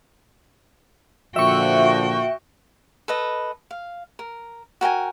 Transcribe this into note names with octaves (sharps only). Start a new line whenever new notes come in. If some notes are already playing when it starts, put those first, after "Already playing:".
A#2 D3 F3 F#4 E5 G5 C#6
A4 B4 D#5
F5
A#4
F#4 A#4 G5 G#5